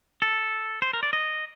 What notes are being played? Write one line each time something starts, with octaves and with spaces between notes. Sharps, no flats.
A4
C5
A#4
D5
D#5